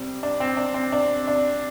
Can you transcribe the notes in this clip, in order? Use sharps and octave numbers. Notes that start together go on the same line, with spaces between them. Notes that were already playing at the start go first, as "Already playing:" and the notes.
Already playing: C3 G3 C4
D4
C4
D4
C4
D4
D4